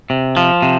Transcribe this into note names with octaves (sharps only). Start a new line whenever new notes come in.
C3
F3
C3